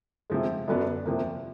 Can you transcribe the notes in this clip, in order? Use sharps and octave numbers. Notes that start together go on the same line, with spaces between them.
C3 F3 G#3
F#2 D3 F#3 B3 D4
C3 F3 A#3